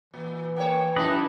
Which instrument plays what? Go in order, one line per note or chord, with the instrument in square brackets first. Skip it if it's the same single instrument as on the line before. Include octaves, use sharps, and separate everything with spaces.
[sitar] A#2 [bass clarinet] E3
[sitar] A#3 C#5 [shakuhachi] G5
[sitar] F#2 D#4 E4 [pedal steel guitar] B4 D5 D#5 [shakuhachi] A5